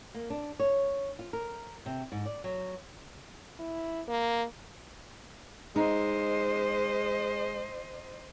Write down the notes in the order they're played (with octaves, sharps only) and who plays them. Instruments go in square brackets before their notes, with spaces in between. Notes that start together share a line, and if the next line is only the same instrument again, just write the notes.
[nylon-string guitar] A#3
D4
C#5
F4
A#4
C3
G#2
D5
F#3
[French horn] E4
A#3
[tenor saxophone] G#3 [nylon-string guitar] D#4 [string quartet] C5 D#5